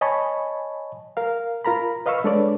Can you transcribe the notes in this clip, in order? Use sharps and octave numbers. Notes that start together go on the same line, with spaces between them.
C#5 D#5 G#5 A5 B5 C#6
A#4 F5
F4 A#4 A#5 B5
B4 D#5 F5 B5 C#6 E6
G#3 D4 A4 B4 C#5 D5